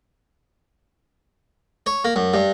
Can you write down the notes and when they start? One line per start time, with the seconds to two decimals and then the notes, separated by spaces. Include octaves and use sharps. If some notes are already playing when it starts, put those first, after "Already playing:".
1.86 C#5
2.05 A#3
2.16 F#2
2.34 G2